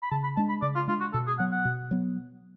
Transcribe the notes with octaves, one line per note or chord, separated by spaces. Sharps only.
B5
C#3 A5
B5
G#3 D4 A5
B5
C#3 D5
F4
G#3 D4 F4
F#4
B2 A4
G#4
F#3 B3 F#5
F#5
B2
F#3 B3